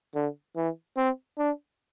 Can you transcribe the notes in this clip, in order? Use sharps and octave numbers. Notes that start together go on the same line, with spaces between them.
D3
E3
C4
D4